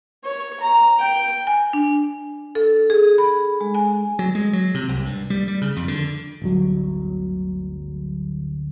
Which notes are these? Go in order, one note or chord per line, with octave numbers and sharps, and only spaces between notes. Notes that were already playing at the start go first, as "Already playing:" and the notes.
C#5
A#5
G5
G#5
D4
A4
G#4
B5
G#3
G#5
F#3
G#3
F#3
C3
C2
G2
G3
G3
C#3
F2
D3
D1 G1 F#3